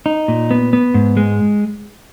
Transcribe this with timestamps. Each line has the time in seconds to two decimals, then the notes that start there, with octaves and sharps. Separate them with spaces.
0.06 D#4
0.28 A#2
0.51 B3
0.73 B3
0.94 G#2
1.17 G#3